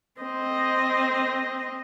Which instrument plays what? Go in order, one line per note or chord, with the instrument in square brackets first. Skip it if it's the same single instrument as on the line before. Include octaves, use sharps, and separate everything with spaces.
[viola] C4 D#5